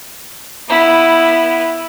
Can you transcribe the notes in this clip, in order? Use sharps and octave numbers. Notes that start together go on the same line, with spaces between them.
B3 E4